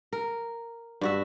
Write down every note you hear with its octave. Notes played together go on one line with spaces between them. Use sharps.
A#4
G2 F#4 E5